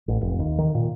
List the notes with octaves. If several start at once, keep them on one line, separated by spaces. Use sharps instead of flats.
A1
F1
D#2
D#3
A#2